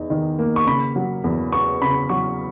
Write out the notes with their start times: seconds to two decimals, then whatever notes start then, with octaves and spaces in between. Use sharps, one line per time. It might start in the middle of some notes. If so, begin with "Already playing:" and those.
Already playing: E2 D#4
0.10 D#3
0.39 A#3
0.56 C#6
0.67 C#3 B5
0.96 F#3
1.24 E2
1.53 B3 C#6
1.82 C#3 B5
2.09 F#3 C#6